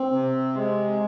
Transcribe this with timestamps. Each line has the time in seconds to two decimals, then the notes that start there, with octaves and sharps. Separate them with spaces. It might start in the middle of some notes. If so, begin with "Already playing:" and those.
Already playing: C4
0.12 C3
0.55 G#3